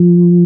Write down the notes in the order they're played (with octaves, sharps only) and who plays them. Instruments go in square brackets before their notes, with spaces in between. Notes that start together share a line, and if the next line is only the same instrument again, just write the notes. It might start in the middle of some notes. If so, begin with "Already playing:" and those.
Already playing: [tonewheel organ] F3